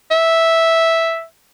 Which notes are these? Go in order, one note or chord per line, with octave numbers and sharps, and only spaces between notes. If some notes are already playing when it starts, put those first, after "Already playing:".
E5